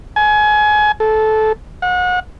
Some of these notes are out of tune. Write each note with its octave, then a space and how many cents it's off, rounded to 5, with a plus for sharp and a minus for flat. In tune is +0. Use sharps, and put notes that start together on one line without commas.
G#5 +25
A4 -15
F#5 -35